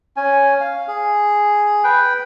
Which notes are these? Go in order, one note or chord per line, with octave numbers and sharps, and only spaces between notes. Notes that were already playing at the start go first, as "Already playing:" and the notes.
C#4 G#5
F5
G#4
B4 G5